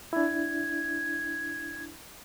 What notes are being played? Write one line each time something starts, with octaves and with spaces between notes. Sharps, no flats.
D4 E4 G#6